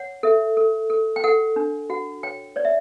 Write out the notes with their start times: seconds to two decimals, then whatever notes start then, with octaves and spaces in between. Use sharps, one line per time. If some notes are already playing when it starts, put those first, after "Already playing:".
Already playing: C#5 F#5
0.23 A4 E5
0.57 A4
0.90 A4
1.16 G5
1.24 A4 F#5
1.56 D4
1.90 F#4 F#5
2.23 C#5 G5
2.56 C#5 D5
2.65 E5